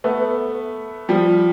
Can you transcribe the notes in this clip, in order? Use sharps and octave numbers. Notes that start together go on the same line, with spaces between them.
A3 B3
F3 G3